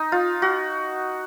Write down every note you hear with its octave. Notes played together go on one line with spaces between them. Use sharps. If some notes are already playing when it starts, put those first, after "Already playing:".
Already playing: D#4
F4
F#4